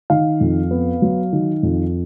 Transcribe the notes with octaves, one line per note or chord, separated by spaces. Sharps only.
D#3 F5
F2
B3
F#3
D#3
F2